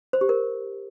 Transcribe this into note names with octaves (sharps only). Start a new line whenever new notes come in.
C5
G4
A#4